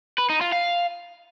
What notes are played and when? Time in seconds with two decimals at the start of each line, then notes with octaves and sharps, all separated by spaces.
0.18 B4
0.30 D#4
0.41 F4
0.52 F5